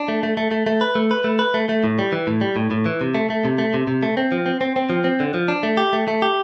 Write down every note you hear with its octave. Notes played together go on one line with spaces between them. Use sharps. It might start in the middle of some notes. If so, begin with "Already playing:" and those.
Already playing: D4
A3
A3
A3
A3
A3
B4
A3
B4
A3
B4
A3
A3
A2
G3
E3
A2
G3
A2
A2
E3
C3
A3
A3
C3
A3
C3
C3
A3
C4
F3
C4
C4
C4
F3
C4
D3
F3
D4
A3
G4
A3
A3
G4